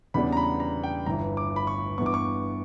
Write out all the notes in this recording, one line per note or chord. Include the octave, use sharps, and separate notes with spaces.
E2 C#3 G3 B3 D4 B5
A#5
B5
A#5
G5
G1 G2 E3 A#5
D6
B5
C#6
G2 E3 B3 C#6
D6
C#6